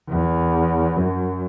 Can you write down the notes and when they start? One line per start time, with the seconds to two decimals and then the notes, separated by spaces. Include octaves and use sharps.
0.09 E2
0.97 F#2